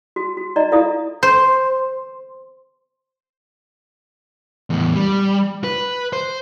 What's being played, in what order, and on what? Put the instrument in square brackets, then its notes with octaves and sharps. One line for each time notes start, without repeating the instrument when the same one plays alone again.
[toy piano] F#4
F#4
D#4 D5 D#5 A#5
E4 F4 A4 D5 F5 D#6
[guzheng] C5
[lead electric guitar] E2 A2
G3
B4
C5